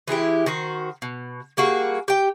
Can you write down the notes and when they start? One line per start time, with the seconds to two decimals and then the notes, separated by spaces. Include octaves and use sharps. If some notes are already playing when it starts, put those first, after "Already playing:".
0.08 E3 G#3 E4 G4
0.46 D#3 F#4 C5
1.02 B2
1.57 G3 A#3 F#4 G#4
2.08 G4 G5